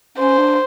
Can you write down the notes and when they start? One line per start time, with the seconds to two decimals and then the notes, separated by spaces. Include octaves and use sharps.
0.18 C#4 C5
0.38 D4